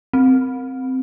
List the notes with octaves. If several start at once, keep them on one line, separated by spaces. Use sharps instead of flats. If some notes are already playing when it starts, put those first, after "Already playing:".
C4